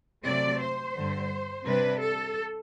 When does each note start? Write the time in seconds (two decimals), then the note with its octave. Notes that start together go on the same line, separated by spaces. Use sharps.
0.25 C3 F#3 A3 C4 D5
0.61 C5
0.95 G2 D3 G3
1.65 C3 G3 D4 B4
2.01 A4